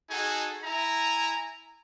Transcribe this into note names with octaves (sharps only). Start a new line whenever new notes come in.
D#4 F#4 G#4 A4 F#5 G#5
E4 G#5 A#5